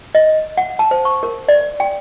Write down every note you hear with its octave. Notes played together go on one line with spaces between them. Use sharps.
D#5
F#5
A5
C5
C#6
A#4
D5
G5